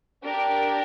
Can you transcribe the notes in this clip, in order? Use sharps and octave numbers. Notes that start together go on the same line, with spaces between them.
D4 G4 A#4